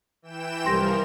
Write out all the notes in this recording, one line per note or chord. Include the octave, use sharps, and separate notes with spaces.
E3 G5 E7
C2 F3 G3 A#4 C6 A#6